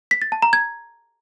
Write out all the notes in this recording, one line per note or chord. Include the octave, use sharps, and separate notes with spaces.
B6
A6
A5
A#5
G#6